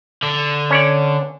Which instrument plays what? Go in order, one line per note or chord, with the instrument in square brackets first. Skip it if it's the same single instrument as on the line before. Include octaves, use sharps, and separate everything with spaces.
[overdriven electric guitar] D3
[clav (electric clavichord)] C#4 C#5 D5